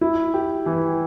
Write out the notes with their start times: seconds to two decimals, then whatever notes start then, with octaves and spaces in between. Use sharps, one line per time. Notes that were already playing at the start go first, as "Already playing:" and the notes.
0.01 E4
0.34 G4
0.66 E3